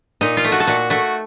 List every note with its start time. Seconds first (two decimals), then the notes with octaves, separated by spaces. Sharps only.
0.21 A#2 D#4
0.37 F4
0.44 A3
0.52 F#4
0.60 A4
0.67 A#2 F#4
0.90 A3 F#4